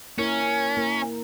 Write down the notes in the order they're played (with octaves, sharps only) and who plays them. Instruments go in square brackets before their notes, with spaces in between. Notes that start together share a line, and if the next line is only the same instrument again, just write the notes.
[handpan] A#3 E4 A#4 [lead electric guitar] C#4
[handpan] A#3 E4 A#4